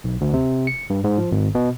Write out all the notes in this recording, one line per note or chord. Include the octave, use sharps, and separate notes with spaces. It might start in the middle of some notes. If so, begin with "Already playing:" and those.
B1
D2
C3
C#7
G2
G#2
F3
G#1
B2